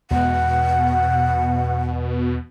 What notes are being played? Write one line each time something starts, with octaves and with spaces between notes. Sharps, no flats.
E2 B2 G#3 F#5